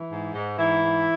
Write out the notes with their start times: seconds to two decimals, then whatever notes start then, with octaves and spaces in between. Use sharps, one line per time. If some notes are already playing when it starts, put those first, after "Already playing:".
Already playing: E3
0.10 G#2
0.34 G#2
0.58 G#2 E3 E4
0.82 G#2